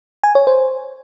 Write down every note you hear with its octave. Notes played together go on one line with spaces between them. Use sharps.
G#5
C#5
C5